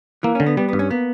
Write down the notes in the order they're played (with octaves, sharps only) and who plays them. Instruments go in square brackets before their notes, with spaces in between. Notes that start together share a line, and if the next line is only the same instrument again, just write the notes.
[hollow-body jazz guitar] E3 [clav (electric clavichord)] A#3
[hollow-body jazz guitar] C#4
[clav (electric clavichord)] D3
[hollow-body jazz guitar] B3
[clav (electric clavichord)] G3 [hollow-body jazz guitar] B3
[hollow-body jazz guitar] B3
[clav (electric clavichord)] G2
[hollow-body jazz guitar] C#4
[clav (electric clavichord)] A#3 [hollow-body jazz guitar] B3